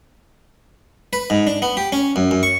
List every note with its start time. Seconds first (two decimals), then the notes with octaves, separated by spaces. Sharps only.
1.13 B4
1.30 G#2
1.47 D4
1.62 B3
1.77 G4
1.92 C#4
2.16 F#2
2.31 F#2
2.43 C#6